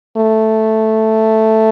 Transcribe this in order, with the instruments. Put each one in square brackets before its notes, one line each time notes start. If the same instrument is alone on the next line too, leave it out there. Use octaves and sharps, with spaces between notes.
[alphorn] A3